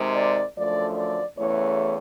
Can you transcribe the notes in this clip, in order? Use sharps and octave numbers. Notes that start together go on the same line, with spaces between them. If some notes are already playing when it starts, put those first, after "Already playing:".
Already playing: C3 D#3 G#3
D5
F#2 D3 F3 A3 D5
D5
E2 C#3 E3 A3 C#5